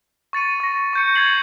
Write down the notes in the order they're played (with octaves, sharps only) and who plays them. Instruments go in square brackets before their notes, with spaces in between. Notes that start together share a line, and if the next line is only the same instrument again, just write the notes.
[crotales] C#6 A6 C#7 D#7
C#6 A#6
C#6 G6 C#7
C#6 G#6 A6 C7 F7 F#7